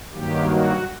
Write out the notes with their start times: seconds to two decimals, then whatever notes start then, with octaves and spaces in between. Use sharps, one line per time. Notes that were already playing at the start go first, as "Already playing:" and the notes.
0.13 G2 D#3 F#3 A#3 G4
0.51 F#4